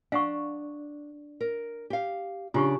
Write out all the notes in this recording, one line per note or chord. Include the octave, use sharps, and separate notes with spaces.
D4 F5 F#5 C#6
A#4
G4 F5
C#3 D4 F4 G4 C#6